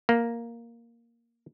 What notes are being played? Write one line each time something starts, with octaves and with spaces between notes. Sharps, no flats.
A#3